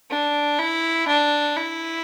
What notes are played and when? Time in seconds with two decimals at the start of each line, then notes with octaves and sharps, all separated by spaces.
0.10 D4
0.59 E4
1.08 D4
1.56 E4